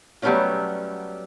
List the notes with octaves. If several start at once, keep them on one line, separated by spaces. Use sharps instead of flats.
F#3 G3 A3 B3 C#4 F4